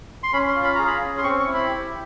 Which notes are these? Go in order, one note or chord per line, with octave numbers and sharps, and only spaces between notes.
C6
C#4 B5
C6
F4
B5
G#4 A#5
B5
C#4
C6
C4 C#6
C#6
E4
B5
G4